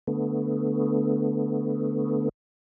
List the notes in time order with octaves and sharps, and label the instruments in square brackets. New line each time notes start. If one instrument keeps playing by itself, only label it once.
[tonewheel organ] D3 A3 B3